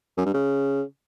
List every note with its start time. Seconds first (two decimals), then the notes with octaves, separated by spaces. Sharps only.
0.18 F#2
0.26 G2
0.34 C#3